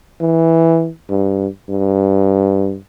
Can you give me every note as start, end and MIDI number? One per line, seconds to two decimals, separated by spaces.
0.20 0.89 52
1.09 1.47 43
1.69 2.76 43